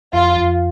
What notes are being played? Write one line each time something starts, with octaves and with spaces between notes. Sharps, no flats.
F2 F4
F2